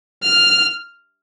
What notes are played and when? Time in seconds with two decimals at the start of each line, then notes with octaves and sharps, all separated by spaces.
0.23 F6